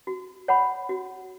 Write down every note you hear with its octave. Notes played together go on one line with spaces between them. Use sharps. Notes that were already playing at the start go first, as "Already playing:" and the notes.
F#4
C#5 F#5 B5
F#4